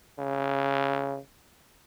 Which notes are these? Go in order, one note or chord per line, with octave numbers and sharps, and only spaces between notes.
C#3